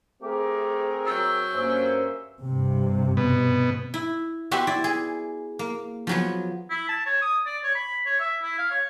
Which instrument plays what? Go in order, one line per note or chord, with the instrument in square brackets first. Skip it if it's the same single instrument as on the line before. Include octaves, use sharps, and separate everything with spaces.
[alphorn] A3 [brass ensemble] C4 G#4 A#4 [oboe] G4
[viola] F#3 G5 [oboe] E5
[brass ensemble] G2 A#3 C#4 [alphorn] C5 [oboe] E5
[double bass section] G2 C3
[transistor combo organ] B2
[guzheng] E4
B3 F#4 G4 C5 E5
E4 D5
G#4
A#3
F3 F#3 B3
[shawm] E4
A5
C#5
D#6
D5
C#5
B5
C#5
E5
E4
F5
C#5